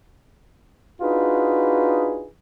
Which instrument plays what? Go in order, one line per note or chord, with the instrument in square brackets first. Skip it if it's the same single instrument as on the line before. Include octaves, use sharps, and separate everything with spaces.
[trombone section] D4 D#4 F4 F#4 G#4 B4